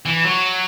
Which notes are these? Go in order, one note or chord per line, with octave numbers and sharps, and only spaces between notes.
E3
F#3